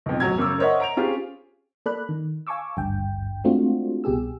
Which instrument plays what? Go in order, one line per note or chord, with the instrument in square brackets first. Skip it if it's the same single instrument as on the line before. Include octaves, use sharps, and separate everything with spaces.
[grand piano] B1 F2
D1 F#3 G#6
F#2 C#3 C#4 D6 E6
A#4 C5 C#5 D#5 E5 F#5
A#5 D7 F7
C4 C#4 F4 G4 G#4
[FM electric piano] A#3 A4 D5 B5 F#6
D#3
F5 G#5 A5 C#6 D6 E6
G#1 D2 G2 G5
G#3 A3 C4 D4 F4 F#4
C2 B2 G4 G#4 E6